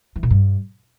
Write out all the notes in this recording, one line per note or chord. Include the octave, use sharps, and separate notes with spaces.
E3
A#2
G2